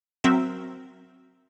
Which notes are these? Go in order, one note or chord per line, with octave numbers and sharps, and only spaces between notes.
F#3 C4 A#4 E5